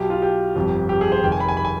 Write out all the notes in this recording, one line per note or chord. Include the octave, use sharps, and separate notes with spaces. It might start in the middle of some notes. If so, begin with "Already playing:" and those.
Already playing: B1 B2 G4
F4
G4
G1 F2 C3 F3
G4
G#4
C5
F1 F2 D#3 G5
G#5
B5
G#5
B5
G#5